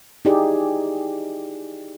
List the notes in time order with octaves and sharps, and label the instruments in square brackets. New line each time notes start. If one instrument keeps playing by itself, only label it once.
[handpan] D#4 E4 G4 G#4 D5